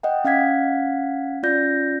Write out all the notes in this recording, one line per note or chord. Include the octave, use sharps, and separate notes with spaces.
D#5 F#5 G5
C#4 F5 F#5 G#6 B6
C#4 F4 D5 G6 A#6